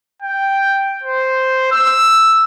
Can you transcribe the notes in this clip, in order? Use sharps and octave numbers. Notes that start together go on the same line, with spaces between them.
G5
C5
E6